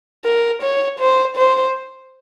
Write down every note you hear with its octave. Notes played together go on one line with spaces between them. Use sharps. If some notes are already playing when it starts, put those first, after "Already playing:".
A#4
C#5
C5
C5